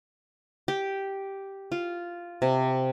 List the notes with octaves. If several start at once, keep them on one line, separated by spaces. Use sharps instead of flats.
G4
F4
C3